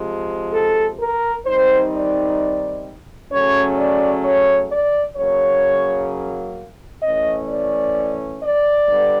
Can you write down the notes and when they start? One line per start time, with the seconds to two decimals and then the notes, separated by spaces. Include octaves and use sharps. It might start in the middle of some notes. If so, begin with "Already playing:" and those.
Already playing: C3 F3 G#3
0.53 A4
0.99 A#4
1.45 D#3 G3 C4 D#4 C5
1.92 D5
3.31 C#3 F#3 A3 C#4 C#5
3.78 D5
4.24 C#5
4.70 D5
5.16 C#3 F#3 A#3 C#5
7.02 E3 A3 C#4 D#5
7.48 D5
8.41 D5
8.88 D3 G3 B3